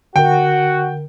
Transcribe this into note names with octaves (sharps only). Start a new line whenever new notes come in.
D3 F#4 A#4 G5